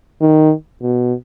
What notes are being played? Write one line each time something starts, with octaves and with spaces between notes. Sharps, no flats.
D#3
B2